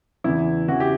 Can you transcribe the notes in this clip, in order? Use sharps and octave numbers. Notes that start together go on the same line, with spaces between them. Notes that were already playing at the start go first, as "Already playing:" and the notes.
E2 C#3 E3 E4
C#3 E3 F#4
G4